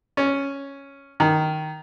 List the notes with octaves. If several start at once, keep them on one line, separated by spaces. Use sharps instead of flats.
C#4
D#3